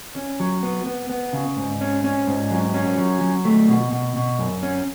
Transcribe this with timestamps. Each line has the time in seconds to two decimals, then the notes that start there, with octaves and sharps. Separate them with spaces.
0.16 C#4
0.40 F#3
0.63 B3
0.86 B3
1.09 B3
1.33 C#3
1.57 G#2
1.81 C#4
2.04 C#4
2.27 G#2
2.51 F#3
2.74 C#4
2.98 F#3
3.21 F#3
3.45 A3
3.69 B2
3.92 B2
4.16 B2
4.39 F#2
4.63 C#4